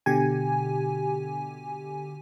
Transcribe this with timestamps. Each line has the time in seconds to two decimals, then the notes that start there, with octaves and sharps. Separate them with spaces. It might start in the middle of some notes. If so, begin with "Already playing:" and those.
0.06 B2 D3 G4 G#5